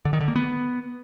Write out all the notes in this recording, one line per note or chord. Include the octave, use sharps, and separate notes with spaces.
D3
D#3
D3
A#3
B3